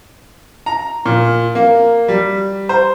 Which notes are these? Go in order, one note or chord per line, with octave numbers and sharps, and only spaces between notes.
A#5
A#2
A#3
G3
C5